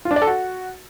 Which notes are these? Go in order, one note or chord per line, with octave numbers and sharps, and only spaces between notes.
F4
D4
D5
A4
F#4